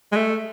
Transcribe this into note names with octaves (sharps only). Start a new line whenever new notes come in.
G#3
A3